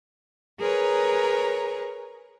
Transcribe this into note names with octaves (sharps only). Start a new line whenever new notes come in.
G#4 A#4 B4 C#5 A#5